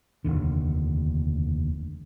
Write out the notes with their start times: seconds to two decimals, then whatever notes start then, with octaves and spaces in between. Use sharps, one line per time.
0.25 F1 A#1 D#2 D3